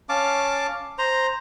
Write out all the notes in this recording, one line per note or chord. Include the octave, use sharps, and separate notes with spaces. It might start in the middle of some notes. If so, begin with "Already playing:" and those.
C#4 F5 A5 D6
C5 A#5